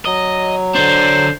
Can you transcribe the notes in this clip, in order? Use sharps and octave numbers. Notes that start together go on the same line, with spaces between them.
F#3 D#5
D3 D4 C5